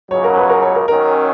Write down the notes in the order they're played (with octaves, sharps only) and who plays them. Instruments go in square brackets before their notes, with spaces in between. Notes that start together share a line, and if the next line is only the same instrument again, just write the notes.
[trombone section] C#2 C#3 F#3 [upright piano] C#5
[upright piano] A#4
B4
A#4
C#5
A#4
[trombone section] D#3 F#3 C#4 [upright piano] A#4